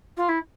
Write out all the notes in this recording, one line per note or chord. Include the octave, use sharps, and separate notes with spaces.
F4
E4